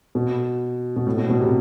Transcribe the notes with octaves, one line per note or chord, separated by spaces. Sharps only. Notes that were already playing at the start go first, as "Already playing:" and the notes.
B2
B2
A2
B2
B2
C3